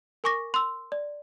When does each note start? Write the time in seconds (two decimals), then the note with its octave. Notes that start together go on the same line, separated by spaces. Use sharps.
0.24 A#4 G#5 C#6 D6 A#6
0.54 C6 E6
0.92 D5